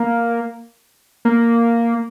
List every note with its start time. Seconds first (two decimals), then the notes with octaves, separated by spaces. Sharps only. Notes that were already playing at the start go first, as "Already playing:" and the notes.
Already playing: A#3
1.25 A#3